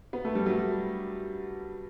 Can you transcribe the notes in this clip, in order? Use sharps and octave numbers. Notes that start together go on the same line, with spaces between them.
B3
A3
G3
F#3 A3